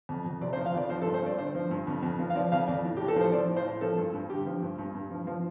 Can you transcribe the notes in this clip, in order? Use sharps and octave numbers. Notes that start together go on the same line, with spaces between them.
F2
F2
C3 D5
C5
F3
F5
F2 D5
F3 C5
A4
G2
C5
G2 D5
D3 C5
F3
G2
F2
F2
F3
F5
F3 D5
F2 F5
F2 D5
A2
A2 G4
A4
F3 C5
F3 D5
A2
C5
A2
F3 A4
G2
G2
D3 G4
F3
G2
G2
G2
F3
F3